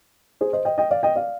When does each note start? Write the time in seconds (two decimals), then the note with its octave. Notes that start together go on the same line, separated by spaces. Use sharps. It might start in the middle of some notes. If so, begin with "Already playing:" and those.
0.41 G#4 C5
0.53 C5 D#5
0.65 D#5 G5
0.78 D#5 G5
0.91 D5 F5
1.03 D#5 G5
1.15 D5 F5